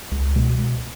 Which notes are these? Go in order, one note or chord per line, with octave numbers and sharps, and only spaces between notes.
C#2
B2 G#3